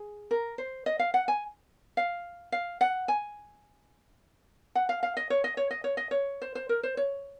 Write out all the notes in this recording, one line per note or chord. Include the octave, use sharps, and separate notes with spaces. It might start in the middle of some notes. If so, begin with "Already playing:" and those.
Already playing: G#4
A#4
C5
D#5
F5
F#5
G#5
F5
F5
F#5
G#5
F#5
F5
F5
D#5
C#5
D#5
C#5
D#5
C#5
D#5
C#5
C5
C5
A#4
C5
C#5